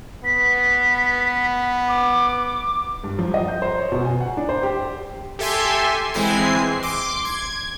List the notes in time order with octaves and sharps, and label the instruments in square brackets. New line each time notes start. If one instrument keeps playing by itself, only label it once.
[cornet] B3 [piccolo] B6
[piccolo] D6
[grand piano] G2
F3
D#5
G6
C5
C#5
B2
G#5
F#5
D4
C5
G4
[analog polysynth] G4 A4 E5 G#5 C6
E3 G#3 C4 E4 G#5 C7
C6 D6
G#6